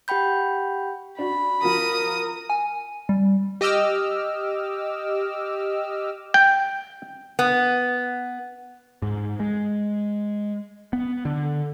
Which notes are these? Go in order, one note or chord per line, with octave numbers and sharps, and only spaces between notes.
G4 F#5 G5 B5 G6
D4 F#4 B5
F3 F#4 A#4 D#6
G#5
G3
G4 D#5 D6 E6 F6
G5
B3
G#2
G#3
B3
D3